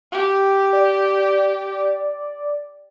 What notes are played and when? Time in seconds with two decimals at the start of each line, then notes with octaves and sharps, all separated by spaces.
0.12 G4
0.73 D5